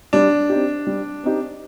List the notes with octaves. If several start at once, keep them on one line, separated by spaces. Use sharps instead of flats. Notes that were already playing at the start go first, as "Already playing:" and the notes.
G3 D4
C4 D#4 G4
G3
C4 D#4 G4